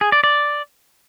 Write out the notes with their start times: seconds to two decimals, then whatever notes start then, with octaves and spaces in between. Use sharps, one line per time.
0.01 G#4
0.12 D5
0.24 D5